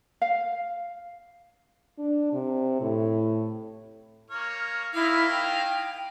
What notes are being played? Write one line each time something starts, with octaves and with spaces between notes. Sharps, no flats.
F5
D4
C3
A2
A#3 C#5 F6
D#3 A#3 E4 F5
G5